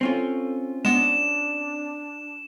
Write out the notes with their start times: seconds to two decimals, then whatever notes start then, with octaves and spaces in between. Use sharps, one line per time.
0.01 C4 C#4 F4 A4
0.85 G#3 B3 D4 E7